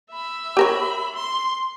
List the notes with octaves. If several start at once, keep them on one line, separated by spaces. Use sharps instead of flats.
E5 B5
G4 A#4 C#5
C6